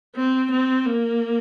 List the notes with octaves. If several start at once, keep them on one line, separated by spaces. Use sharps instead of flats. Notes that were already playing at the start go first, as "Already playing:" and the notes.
C4
C4
A#3